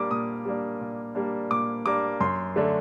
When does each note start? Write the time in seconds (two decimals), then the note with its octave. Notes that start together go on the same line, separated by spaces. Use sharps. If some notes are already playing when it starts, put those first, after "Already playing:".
Already playing: A#2 G3 A#3 D4 D6
0.11 A#2 D#6
0.45 G3 A#3 D4
0.81 A#2
1.15 G3 A#3 D4
1.51 A#2 D6
1.86 G3 A#3 D4 D6
2.20 F#2 C6
2.56 D3 A3 D4